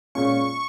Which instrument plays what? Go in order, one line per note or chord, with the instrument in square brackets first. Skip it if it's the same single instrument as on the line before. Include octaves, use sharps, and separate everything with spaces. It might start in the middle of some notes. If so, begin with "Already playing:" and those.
[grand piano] A#2 G#3 C#4 F4 [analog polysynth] C#6